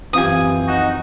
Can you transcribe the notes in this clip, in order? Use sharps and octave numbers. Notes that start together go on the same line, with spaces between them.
F#2 E3 F3 C4 F4 G4 G#5 D#6
D#4 F#4